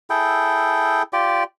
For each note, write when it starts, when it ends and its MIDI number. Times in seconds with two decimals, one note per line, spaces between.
0.10 1.02 64
0.10 1.02 68
0.10 1.02 69
0.10 1.02 79
1.13 1.43 65
1.13 1.43 67
1.13 1.43 74